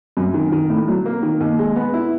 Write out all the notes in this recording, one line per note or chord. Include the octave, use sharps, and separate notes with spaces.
F#2
D#3
D#3
A2
F#3
A#3
D#3
D#2
G#3
B3
E4